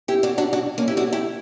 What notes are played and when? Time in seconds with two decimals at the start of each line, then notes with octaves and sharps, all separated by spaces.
0.08 E4 G4
0.23 D4 F#4
0.38 D4 F#4
0.53 D4 F#4
0.78 A#3 C#4
0.88 E4 G4
0.97 D4 F#4
1.13 E4 G4